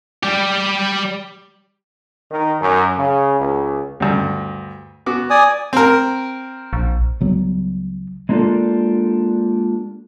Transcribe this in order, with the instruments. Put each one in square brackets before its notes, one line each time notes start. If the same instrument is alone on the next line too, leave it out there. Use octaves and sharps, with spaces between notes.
[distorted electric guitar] G3 G4
[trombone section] D#3
F#2
C#3
C#2
[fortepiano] D2 G2
B3 F#4 D6
[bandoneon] D5 G#5 D#6
[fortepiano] C4 A#4
[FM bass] A#1
[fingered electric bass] C#2 F#3 G3 B3
[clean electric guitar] G#3 A#3 D4 F4 G4 A4